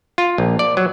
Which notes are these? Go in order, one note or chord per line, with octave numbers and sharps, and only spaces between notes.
F4
A#1
D5
F#3